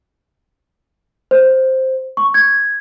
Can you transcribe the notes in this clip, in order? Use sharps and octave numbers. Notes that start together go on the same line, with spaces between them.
C5
C#6
G#6